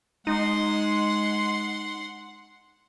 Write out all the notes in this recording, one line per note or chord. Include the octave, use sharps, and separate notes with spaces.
G#3 D#4 F#5 C6